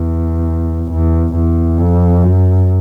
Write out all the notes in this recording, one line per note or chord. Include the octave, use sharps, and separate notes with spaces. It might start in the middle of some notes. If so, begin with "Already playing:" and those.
Already playing: E2
E2
E2
F2
F#2